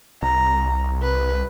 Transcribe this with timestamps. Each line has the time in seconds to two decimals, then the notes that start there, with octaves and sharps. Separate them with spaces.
0.22 C2 A#5
1.03 B4